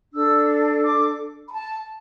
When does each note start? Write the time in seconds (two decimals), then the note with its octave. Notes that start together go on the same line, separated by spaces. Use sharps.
0.14 D4 A4 E6
0.84 D6
1.48 B5
1.54 A5